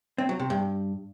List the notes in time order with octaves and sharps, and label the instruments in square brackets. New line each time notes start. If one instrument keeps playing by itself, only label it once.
[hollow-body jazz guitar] C4
F#3
C3
G2